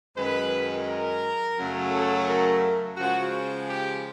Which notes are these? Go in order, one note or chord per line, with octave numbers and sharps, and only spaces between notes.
F#2 D#3 G#3 B4
A#4
F#2 C#3 F#3 A3
A4
A#4
C#3 F3 G#3 F#4
G4